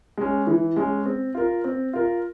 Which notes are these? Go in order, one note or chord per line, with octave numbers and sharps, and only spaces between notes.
G#3 C#4
E3
G#3 C#4
C4
F4 A#4
C4
F4 A#4